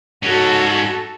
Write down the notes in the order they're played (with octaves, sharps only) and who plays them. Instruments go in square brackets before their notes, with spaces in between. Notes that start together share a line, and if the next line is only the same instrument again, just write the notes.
[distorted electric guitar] G#2 C#4 [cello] F#4 A4